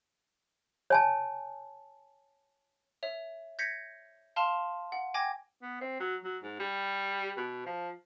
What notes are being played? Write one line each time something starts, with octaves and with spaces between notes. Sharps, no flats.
C#5 G#5 A5
C#5 E5 F7
G6 G#6 A#6 B6 C#7
F5 A5 C6 F6 E7 F7
F#5
G5 G#5 D6 G#6 A#6
B3
C4
F#3
F#3
G#2
G3
B2
F3